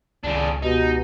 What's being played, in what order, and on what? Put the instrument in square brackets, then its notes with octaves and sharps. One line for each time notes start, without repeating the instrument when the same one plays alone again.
[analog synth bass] C#2 [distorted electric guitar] C#3 D4
[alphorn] B2 [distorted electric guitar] D#4 [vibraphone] G4 F#5